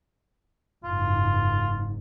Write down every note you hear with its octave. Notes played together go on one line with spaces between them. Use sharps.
F#1 G#2 F4